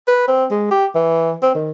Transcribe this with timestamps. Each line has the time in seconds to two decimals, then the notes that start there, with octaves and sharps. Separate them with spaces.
0.08 B4
0.28 C4
0.51 G#3
0.71 G4
0.95 E3
1.42 C4
1.55 D#3